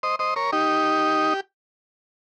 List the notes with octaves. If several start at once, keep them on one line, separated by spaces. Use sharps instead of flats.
C5 D#5
C5 D#5
A#4 C#5
D#4 G4